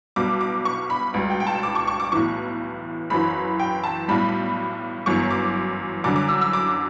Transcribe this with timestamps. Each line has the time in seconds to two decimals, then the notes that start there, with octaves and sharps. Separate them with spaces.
0.16 B1 B2 G3 D6
0.41 D6
0.65 C#6
0.90 B5
1.14 C#2 B2 G3
1.30 G5
1.40 G5
1.47 A5
1.63 D6
1.75 C#6
1.87 C#6
2.00 D6
2.12 B1 A2 E3 C#6
3.10 F#1 F#2 E3 B5
3.60 G5
3.84 A5
4.08 B1 A2 G3 B5
5.06 G1 F#2 E3 C#6
5.31 D6
6.04 F#2 D3 G3 D6
6.16 D6
6.28 E6
6.41 E6
6.53 D6